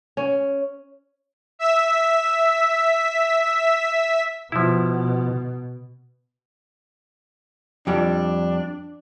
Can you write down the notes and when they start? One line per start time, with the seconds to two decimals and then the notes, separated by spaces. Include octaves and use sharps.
0.17 C#4
1.59 E5 E6 B6
4.52 B2 F3 E4
7.87 F2 G3 D4